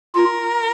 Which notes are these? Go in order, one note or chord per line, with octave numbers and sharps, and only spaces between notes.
F4 A#4